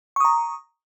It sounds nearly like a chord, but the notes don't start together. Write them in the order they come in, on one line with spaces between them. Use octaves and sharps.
C#6 D#6 A#5